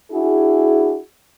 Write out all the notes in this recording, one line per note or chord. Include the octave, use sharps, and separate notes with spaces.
D4 E4 F#4 G#4